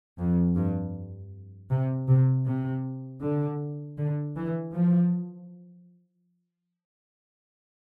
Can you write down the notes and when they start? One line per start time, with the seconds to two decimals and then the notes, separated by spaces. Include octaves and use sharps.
0.18 F2
0.56 G2
1.70 C3
2.08 C3
2.46 C3
3.22 D3
3.97 D3
4.36 E3
4.74 F3